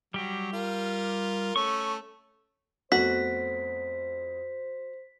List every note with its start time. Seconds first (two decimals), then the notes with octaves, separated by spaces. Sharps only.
0.14 F#3 G3 G4
0.53 F4 A#4
1.56 A3 C#4 C#6
2.92 F2 A3 B3 F#4 C5 B6